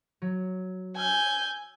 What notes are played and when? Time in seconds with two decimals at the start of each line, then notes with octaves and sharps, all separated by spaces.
0.22 F#3
0.97 G#5 E6 F6 G6